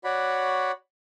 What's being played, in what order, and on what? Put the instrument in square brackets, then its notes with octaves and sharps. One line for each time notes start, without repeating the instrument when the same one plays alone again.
[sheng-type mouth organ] F#4 C#5 D5 F#5 B5